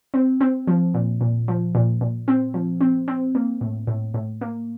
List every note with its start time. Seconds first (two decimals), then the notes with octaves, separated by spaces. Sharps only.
0.14 C4
0.41 C4
0.67 F3
0.94 A#2
1.21 A#2
1.48 F3
1.75 A#2
2.01 A#2
2.28 C4
2.54 F3
2.81 C4
3.08 C4
3.35 A#3
3.61 A2
3.87 A2
4.14 A2
4.41 A#3